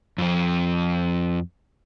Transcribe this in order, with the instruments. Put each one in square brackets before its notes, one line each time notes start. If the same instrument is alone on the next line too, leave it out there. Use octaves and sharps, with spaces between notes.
[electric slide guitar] F2 F3